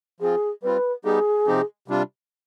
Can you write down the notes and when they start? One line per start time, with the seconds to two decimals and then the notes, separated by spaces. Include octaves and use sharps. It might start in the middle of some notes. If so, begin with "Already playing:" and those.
0.20 F3 C4 F4 G#4
0.63 G3 C4 F4 B4
1.04 G3 B3 D#4 G4 G#4
1.47 C3 F3 C4 D#4 G4
1.88 C3 G3 D4 F4